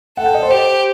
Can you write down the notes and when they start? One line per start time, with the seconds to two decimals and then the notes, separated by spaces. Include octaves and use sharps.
0.17 A4 F#5
0.26 G5
0.34 D#5
0.43 C5
0.51 G4